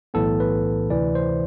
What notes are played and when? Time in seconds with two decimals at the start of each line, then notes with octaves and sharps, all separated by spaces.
0.14 B1 A2 E3 B3 A4
0.40 B4
0.90 D2 C3 E3 D5
1.15 C5